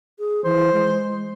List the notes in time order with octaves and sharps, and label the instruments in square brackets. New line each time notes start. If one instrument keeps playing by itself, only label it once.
[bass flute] G#4
[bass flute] E3 [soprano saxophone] C5
[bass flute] G#3